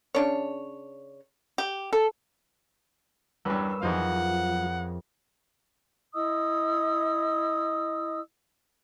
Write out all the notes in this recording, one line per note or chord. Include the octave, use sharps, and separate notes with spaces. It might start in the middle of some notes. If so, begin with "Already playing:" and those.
C#3 D4 C#5
G4
A4
E2 G2 G3 C#4 A#4 B4 E6
F2 E3 F#3 D#4 F4 G#4 C5 F#5
E4 D#5 D#6 E6